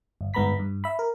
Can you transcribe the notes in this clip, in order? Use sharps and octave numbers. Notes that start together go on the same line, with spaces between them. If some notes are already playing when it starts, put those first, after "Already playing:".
G1
G1 G#2 B3 A#5 B5 B6
G2
E5 B5
A#4